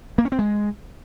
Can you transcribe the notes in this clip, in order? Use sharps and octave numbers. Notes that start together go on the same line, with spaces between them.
A#3
C#4
C4
G#3